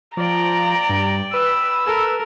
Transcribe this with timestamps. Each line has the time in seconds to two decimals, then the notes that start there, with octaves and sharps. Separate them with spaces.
0.17 F3 D5 G5 A#5
0.90 G2
1.34 B4 E6
1.85 A4 A#4